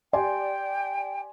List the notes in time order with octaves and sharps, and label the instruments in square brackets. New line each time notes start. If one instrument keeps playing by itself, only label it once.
[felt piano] G4 G#5 C6 [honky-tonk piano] D5 [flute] G5